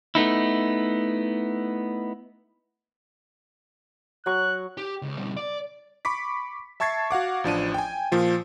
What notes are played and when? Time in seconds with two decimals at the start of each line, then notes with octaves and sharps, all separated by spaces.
0.15 A3 B3 D#4 E4
4.26 F#3 C#6 F#6
4.78 G4
5.02 C#2
5.18 B2 G3
5.37 D5
6.05 B5 C#6 D6 B6
6.80 E5 A5 C#6 G#6 A6 C7
7.11 F#4 F5 F#5 D6
7.44 A1 F3 D4 D#7
7.74 G5 G#5
8.12 A#2 F3 F4